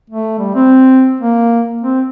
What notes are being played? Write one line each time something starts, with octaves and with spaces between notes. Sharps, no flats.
A3
G3
C4
A#3
C4